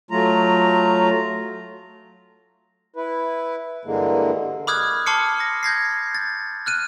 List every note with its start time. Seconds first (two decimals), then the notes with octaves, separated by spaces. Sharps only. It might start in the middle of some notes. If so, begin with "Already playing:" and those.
0.11 F#3 A3 F4 A#5
2.96 E4 B4
3.85 G2 D3 E3 G#3 A#3
4.67 B5 D6 D#6 F6 F#6 G#6
5.06 A5 C6 D6 F6 C7 C#7
5.40 A#6
5.63 G6 G#6 A#6 C7
6.15 A6
6.66 F6 F#6 D#7